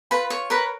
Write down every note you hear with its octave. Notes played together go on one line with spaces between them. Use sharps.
F4 B4 B5
C#5
A#4 B4 B5